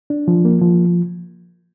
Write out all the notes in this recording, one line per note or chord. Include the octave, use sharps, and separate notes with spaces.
D4
F3
A#3
F3